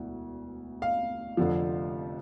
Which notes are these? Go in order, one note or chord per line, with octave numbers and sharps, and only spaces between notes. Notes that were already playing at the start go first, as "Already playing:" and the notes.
Already playing: E1 D2 E3
F5
F1 F2 D3 F3